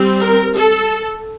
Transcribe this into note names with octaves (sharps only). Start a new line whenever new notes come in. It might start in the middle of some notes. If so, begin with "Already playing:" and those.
Already playing: G3 C4
A#4
A4